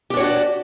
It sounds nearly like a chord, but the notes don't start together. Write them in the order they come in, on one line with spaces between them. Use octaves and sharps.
G4 D4 C#5 F#4 D5